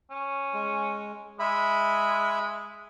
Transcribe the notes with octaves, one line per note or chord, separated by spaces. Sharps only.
C#4
G#3
G#3 E5 B5